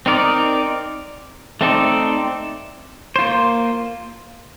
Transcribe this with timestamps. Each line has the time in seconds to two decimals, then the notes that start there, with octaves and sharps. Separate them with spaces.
0.06 C4 D#4 A#4 D5
1.61 A3 C4 D#4 A4 D5
3.16 A#3 F4 C5